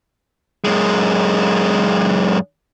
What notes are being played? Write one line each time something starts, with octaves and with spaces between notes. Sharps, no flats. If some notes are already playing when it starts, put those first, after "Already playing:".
F#2 G#3